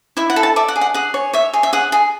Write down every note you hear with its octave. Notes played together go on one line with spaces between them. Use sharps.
E4 E5
F#5
A4
A5
D5 E5
F#5
G#4
F#5
G#4 F#5
C#5
C#5 E5
G#4
E5
G#4 F#5
G#4